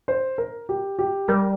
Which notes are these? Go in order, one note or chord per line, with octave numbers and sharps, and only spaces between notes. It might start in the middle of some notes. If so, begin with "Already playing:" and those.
C5
A#4
G4
G4
G3 A#4